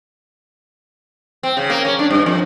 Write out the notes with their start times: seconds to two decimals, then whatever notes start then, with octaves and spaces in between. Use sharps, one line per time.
1.43 C4
1.57 C#3
1.70 A#3
1.85 C#4
1.99 D4
2.10 G2
2.26 F2